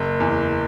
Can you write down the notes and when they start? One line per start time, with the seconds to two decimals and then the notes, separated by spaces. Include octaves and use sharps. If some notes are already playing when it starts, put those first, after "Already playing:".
Already playing: F#1
0.20 E2